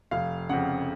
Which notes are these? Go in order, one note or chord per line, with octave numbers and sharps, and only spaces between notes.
F1 F5
F2 C#3 F#5